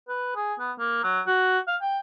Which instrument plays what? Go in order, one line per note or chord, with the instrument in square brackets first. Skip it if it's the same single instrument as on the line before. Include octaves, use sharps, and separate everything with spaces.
[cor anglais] B4
G#4
B3
A#3
F#3
F#4
F5
G5